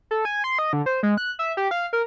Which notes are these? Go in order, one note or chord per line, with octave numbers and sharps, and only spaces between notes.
A4
G#5
C6
D#5
D3
C5
G#3
F#6
E5
G4
F5
A#4